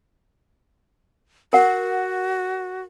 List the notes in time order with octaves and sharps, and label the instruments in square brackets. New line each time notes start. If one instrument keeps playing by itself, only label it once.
[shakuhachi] F#4 [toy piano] A#4 F#5